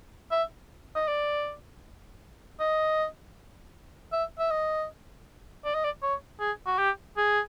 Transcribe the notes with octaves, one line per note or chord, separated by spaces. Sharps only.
E5
D#5
D5
D#5
E5
E5
D#5
D5
D#5
D5
C#5
G#4
F#4
G4
G#4